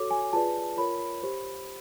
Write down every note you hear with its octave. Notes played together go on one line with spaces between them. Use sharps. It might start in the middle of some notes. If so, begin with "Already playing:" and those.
Already playing: F#4 A4 C#5 D6
G#5
F4 G#4 B4 D5 A5
F4 A#4 C#5 B5
G4 C5